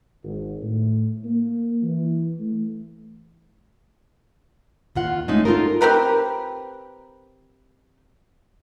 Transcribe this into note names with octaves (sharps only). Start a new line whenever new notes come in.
G#1
A2
A#3
E3
A3
D#2 F4 F#5
G#3 A3 C#4 D#4
D#4 F4 F#4 A4 A#4
C4 G4 A#4 B4